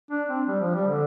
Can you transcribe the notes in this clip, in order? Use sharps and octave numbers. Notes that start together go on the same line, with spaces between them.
D4
C4
G3
F3
G3
D3